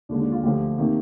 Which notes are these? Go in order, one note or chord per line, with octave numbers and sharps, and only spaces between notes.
D#2 D3 G#3 D4
D4
F4
D2 D3 F3 G4
C3 D#3 A#3